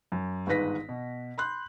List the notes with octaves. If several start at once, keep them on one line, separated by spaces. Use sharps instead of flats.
F#2
G1 G#2 D#3 B4 A#6 B6
B2
B5 C6 F#6 G6